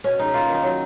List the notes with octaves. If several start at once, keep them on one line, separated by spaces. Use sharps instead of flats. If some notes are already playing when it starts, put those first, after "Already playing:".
B2 C#4
G#3 D#4
A#3 F4
D#3
D#4
F#3